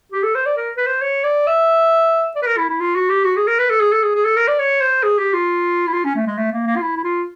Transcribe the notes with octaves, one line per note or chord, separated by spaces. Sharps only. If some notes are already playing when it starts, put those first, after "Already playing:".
G4
A4
C5
D5
A#4
B4
C5
C#5
D5
E5
D5
B4
A#4
E4
E4
F4
F#4
G4
F#4
G#4
A#4
B4
A4
G#4
A4
G#4
G#4
A4
A#4
D5
C#5
C5
G#4
G4
F4
E4
F4
C#4
A3
G#3
A3
A#3
A#3
F4
E4
E4
F4